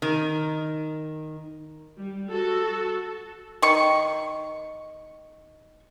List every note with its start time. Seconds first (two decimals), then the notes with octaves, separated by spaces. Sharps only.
0.02 D#3
1.97 G3
2.30 F#4 A4
3.62 D#3 C#6